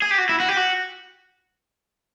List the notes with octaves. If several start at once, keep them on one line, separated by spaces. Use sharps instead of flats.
G#4
G4
F#4
E4
F#4
G4
F#4